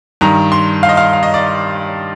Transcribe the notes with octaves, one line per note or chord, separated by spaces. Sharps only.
G2 D#3 A#5
C6
F5
D#5
F5
F5
D#5
D5